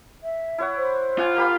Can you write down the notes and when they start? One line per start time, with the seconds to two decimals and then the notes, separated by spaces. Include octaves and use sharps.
0.23 E5
0.58 E4 C#5 F#5
0.77 C5
1.18 F4 D5 F#5 G#5
1.36 A#3 G4 B5